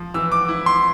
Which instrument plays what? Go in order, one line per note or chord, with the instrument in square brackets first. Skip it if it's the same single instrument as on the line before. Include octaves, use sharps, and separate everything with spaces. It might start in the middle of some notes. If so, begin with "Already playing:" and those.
Already playing: [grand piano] F3
E3 E6
D6
E4
C6